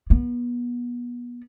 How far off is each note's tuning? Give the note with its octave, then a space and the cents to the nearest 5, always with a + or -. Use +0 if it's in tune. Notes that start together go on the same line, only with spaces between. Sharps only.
B3 -30